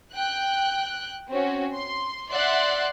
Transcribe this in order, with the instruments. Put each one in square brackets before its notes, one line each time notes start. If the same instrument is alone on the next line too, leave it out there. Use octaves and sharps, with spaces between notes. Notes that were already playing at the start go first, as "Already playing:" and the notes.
[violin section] G5 F#6
C4 C#4 F#4
C6
D5 E5 F#5 C6 F#6